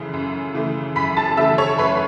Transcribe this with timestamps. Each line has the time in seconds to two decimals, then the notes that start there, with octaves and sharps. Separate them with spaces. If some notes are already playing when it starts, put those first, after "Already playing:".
Already playing: F#2 C#3 E3 A3
0.13 F#2
0.55 C#3 E3 A3
0.96 F#2 B5 B6
1.17 A5 A6
1.37 C#3 E3 A3 E5 E6
1.58 C#5 C#6
1.78 F#2 B4 B5